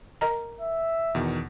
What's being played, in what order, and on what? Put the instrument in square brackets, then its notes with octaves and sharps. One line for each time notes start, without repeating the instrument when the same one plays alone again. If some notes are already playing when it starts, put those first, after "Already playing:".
[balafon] A#4 D#5 A#5
[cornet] E5
[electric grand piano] E2 B2 D#3